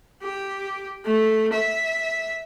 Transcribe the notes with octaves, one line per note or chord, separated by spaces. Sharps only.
G4
A3
E5